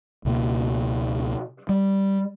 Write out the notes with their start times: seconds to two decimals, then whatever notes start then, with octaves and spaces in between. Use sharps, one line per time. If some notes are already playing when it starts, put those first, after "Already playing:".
0.25 C#2 B2 A#3
1.69 G3